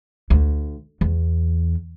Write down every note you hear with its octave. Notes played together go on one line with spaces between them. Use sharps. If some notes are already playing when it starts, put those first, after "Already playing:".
D2
E2